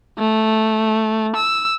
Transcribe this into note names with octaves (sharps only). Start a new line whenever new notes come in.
A3
E6